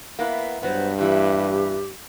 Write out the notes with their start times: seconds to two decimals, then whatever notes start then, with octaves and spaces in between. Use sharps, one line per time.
0.19 A#3 B3 E4
0.63 G2 F#3 B3 C5
0.98 A#2 E3 E4 G4